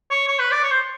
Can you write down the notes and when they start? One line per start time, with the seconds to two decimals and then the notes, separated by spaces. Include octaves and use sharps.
0.10 C#5
0.28 C#5
0.39 B4
0.51 D5
0.63 C#5
0.71 C5